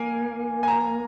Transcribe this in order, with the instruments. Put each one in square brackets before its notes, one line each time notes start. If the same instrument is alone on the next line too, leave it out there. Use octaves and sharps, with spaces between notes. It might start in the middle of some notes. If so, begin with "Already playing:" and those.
Already playing: [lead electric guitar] A#3 [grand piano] G#5
[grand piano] G#5
A#5